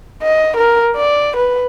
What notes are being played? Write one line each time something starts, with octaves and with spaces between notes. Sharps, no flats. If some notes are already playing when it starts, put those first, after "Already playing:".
D#5
A#4
D5
B4